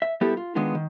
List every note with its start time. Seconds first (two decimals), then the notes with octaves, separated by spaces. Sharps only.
0.02 E5
0.21 G3 B3 E4 G4 A4
0.37 F4
0.55 D#3 G#3 B3 D4 F4
0.75 D#3